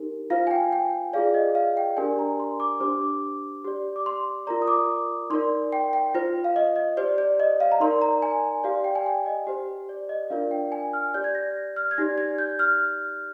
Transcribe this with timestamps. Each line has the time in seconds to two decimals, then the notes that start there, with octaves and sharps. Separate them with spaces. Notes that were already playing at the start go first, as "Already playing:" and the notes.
Already playing: D#4 G4 A#4
0.30 F4 C5 F5
0.47 G#5
0.51 G5
0.73 G5
1.13 F4 G#4 D5 F5
1.34 D#5
1.55 F5
1.77 G5
1.97 D4 G4 A#4 D5 G#5
2.19 A#5
2.40 C6
2.60 D6
2.80 D4 G4 C5 D6
3.01 D6
3.65 G4 D5
3.96 D6
4.06 C6
4.47 F4 A#4 D5 A#5
4.62 D#6
4.68 D6
5.30 D#4 C6
5.33 A#4 D5
5.72 G5
5.93 G5
6.15 F4 C5
6.44 F5
6.56 D#5
6.76 D#5
6.97 G4 C5 D5
7.18 D5
7.40 D#5
7.60 F5
7.72 A#5
7.80 D#4 A#4 D5 C6
8.02 A#5
8.22 G#5
8.64 G4 D5 F5
8.84 G5
8.95 G#5
9.06 G5
9.26 D#5
9.47 G4 C5
9.89 D5
10.09 D#5
10.30 D4 F4 A#4 D5 F5
10.51 G5
10.72 G#5
10.93 F6
11.14 G4 D5 G6
11.24 G#6
11.35 A#6
11.76 F6
11.91 G#6
11.98 D#4 G4 D5 A#6
12.18 G#6
12.38 G6
12.59 F6